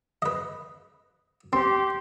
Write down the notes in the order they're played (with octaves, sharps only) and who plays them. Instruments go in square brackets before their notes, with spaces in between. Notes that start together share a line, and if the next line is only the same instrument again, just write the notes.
[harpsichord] B4 D#5
[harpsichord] C4 [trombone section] G4 [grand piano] C6